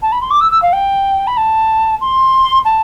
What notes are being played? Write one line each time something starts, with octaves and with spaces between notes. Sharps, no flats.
A5
B5
C6
D6
E6
E6
F5
G5
B5
A5
C6
A5